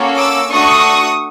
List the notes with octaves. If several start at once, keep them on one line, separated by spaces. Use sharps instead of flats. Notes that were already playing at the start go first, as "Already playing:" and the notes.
Already playing: A#3 C#4 F#4 A4
D6 E6
A3 D4 F#4 A4 C#6 D#6